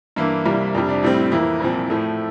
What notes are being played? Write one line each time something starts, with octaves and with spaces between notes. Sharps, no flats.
G2 E3 A#3 E4
C2 C3 G3 A#3
F2 C3 G3 D4
D4
A2 G3 C4 E4
E4
F2 E3 A#3 E4
C2 A#2 F3 C4
A2 F3 A3